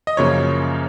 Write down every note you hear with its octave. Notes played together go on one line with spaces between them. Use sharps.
D#5
F#2 C#3 F3 A#3 C#4 C#5